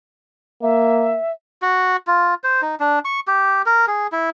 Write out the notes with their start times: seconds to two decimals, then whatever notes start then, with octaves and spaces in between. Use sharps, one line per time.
0.62 A#3 E5
1.62 F#4
2.07 F4
2.44 C5
2.62 D#4
2.80 D4
3.05 C#6
3.28 G4
3.66 A#4
3.88 G#4
4.12 E4